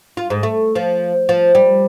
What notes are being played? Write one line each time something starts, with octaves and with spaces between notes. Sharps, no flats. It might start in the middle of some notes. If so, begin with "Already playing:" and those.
F4
G#2
A3
F3
F3
G3